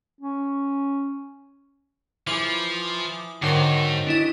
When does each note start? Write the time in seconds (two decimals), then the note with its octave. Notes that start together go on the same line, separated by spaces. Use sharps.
0.21 C#4
2.27 E3 F3 G#4 D6
3.42 G#2 D3 D#3 F#3 C5 A#6
4.07 D4 E4 D#5